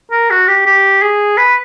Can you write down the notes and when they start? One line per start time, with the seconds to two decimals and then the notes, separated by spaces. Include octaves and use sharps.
0.11 A#4
0.30 F#4
0.48 G4
0.66 G4
1.02 G#4
1.37 B4